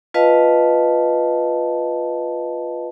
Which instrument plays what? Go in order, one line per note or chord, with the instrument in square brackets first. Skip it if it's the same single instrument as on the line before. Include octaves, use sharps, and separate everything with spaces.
[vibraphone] F4 B4 D#5 F5 A5